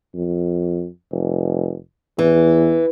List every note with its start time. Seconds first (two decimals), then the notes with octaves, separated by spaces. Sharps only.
0.15 F2
1.12 F1
2.19 E2 E3